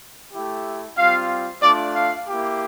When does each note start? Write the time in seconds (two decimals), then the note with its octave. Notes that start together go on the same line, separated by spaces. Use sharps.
0.33 A3 E4 G4
0.98 G3 C4 F4 F5
1.63 A3 D4 F4 D5
1.95 F5
2.28 A#3 E4 G4